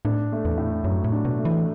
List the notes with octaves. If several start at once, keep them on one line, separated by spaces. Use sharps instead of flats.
A2 D4
A3
E2
A2
F#2 F#3
A2
D4
B2
A3
E3